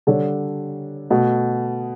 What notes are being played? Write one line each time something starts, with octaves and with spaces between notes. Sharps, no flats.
D3 G3 D4 A4 C#5
B2 A3